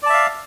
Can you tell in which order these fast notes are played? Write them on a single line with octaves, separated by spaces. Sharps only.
D5 A5 E5 F5